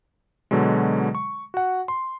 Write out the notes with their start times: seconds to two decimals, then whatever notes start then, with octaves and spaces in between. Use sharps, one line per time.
0.51 B2 D3 F#3 G#3
1.15 C#6
1.54 F#4 F#5
1.88 C6